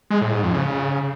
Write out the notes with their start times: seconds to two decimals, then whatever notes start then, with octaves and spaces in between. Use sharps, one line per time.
0.10 G#3
0.21 A2
0.32 G#2
0.43 F2
0.54 C#3